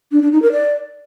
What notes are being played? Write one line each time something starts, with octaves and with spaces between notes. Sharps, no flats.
D4
D4
D#4
A#4
D5